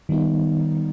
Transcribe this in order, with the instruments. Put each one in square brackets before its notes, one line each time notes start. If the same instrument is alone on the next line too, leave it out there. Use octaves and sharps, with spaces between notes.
[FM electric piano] D#3 G3 B3 D#4